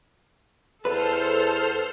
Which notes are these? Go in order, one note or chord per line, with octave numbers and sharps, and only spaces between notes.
E2 A4 B4 C5 F6